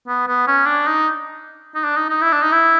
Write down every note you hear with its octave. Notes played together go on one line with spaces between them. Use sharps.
B3
B3
C#4
D4
D#4
D#4
D4
D#4
D#4
E4
D4
D#4
E4